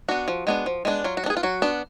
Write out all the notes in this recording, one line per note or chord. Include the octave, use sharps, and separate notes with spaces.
B3 D4 F#4
F3
G#3 B3 D4
F3
G#3 B3 D4
F#3 F4
F#4
B3 D4
G#4
F4
F#3 F#4
B3 D4